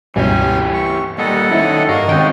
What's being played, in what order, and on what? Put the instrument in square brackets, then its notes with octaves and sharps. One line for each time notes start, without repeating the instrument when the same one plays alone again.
[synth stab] C#2 G2 B2 [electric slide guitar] E3 G4 [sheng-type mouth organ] C#4 G#5
[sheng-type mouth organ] C#6
[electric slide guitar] A#2 G3 [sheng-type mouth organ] A4 D#5 F#5
[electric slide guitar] D#3 F#3 C#4 [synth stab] E4
[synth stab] G2 [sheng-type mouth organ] F#4 D#5 [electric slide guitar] A#4 F5
[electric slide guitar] C3 G#3 C#4 [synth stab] D#3 G5